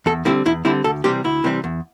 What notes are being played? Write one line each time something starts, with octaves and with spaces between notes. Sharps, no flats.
E2 A4
D3 G3 C4 E4
E2 E4
D3 G3 C4 E4
D2 A4
C3 E3 G3 C4 G4
D2 E4
C3 E3 G3 C4
E2